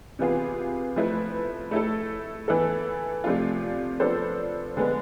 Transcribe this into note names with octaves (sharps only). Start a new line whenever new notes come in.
C3 E3 B3 F4 G#4
F3 A3 E4 B4
A3 E4 A4
E3 B3 E4 A4
C3 F3 A3 D4 F4
F3 B3 D4 A4 C5
D3 G#3 B3